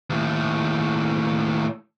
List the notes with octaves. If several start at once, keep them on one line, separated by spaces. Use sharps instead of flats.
D#2 A2